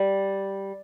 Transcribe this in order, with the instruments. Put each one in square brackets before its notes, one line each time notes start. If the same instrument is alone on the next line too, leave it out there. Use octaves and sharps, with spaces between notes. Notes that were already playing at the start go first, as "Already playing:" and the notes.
Already playing: [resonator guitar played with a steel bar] G3